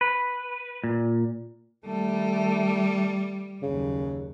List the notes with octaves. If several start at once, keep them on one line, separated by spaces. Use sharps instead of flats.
B4
A#2
D#3 G3 A3
F#1 D#2 C#3